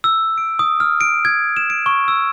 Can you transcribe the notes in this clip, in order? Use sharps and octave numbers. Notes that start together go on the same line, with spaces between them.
E6
D7
D#6
F6
D7
G#6
E7
D7
C#6
E6